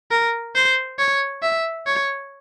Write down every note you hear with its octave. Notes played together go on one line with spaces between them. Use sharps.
A#4
C5
C#5
E5
C#5